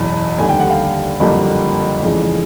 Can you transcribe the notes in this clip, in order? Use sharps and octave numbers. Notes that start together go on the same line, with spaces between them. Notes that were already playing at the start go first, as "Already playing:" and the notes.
Already playing: F#1 E2 B2 F#3
F1 D#2 D3 G3 G#5
G5
F#5
F5 G5
F#1 F2 D3 G3 A#3
F1 F2 C#3 E3 G#3